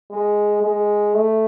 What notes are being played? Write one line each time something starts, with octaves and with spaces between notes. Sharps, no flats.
G#3
G#3
A3